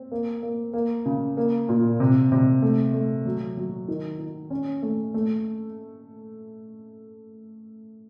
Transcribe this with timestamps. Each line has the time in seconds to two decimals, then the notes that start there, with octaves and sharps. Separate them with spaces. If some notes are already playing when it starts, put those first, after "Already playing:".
Already playing: C4
0.12 A#3
0.43 A#3
0.74 A#3
1.06 C#3
1.37 A#3
1.69 A#2
2.00 C3
2.32 C3
2.62 A3
2.94 A3
3.26 F#3
3.57 F#3
3.88 D#3
4.19 D#3
4.50 C#4
4.82 A3
5.14 A3